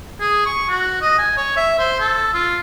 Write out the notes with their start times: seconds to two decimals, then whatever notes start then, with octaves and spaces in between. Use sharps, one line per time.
0.20 G#4
0.46 C#6
0.70 F#4
1.02 D#5
1.19 G#5
1.37 C#5
1.57 E5
1.79 C5
2.00 A4
2.34 F4